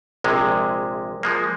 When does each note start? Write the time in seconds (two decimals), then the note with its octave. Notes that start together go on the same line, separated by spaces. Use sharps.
0.24 A#1 C3 G#3
1.23 F3 G#3 A#3